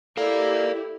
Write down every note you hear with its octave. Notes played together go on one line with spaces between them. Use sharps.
E4 G4 A4 A#4 D5 F5